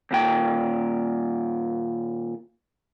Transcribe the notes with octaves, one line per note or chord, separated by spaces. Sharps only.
D#2 A#2 G5